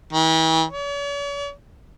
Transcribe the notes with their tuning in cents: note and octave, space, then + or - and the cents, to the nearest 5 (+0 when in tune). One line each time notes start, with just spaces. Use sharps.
E3 -40
C#5 +45